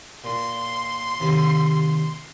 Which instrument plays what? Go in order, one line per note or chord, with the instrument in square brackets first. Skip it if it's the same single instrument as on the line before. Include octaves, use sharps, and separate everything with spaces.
[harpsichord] A#2 [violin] C6
[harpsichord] D#2 C3 B5